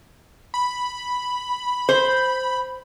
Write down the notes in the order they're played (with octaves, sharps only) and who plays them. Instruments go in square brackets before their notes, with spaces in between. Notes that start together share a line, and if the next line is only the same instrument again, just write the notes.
[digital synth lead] B5
[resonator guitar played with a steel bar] C5